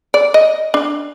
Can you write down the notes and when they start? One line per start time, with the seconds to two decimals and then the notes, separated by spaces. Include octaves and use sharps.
0.14 D5
0.34 D#5
0.74 D4